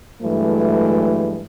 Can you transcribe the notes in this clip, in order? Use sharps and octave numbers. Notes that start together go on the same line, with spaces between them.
G2 E3 F#3 G#3 A3